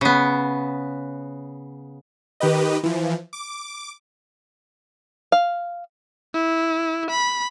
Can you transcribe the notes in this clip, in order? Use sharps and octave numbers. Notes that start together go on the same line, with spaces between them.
C#3 B3
D#3 G4 B4 D#5
E3 F3
D6
F5
E4
B5